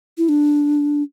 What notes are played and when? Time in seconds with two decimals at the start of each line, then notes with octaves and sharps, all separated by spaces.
0.18 E4
0.29 D4